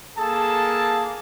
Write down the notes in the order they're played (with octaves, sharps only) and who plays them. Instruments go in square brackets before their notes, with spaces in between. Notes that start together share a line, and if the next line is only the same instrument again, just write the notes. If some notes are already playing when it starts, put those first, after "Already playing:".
[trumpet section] A#3 G#4 A4 A5